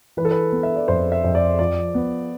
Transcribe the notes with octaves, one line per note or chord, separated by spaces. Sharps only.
E3 B4
A4
B4
B3
E5
D5
F2 C5
E5
F2
D5
F3 D5
B3